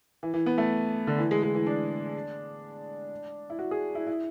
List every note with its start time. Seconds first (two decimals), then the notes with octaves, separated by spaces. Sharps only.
0.23 E3
0.34 E3
0.46 B3
0.58 A3
1.07 D3
1.18 E3
1.31 G#3
1.43 G#3
1.55 E3
1.66 D4
3.50 E4
3.59 F#4
3.71 G#4
3.95 E4
4.07 E4